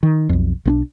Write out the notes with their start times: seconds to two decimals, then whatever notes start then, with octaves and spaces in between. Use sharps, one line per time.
0.03 D#3
0.29 B1 F2
0.65 B1 C4 D4